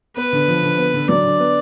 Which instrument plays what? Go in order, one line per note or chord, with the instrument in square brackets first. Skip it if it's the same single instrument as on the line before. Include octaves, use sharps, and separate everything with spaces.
[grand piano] B3 [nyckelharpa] B4
[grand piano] D3
F3
D3
B3
D3
[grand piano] F#3 [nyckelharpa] D5
[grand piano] D3
B3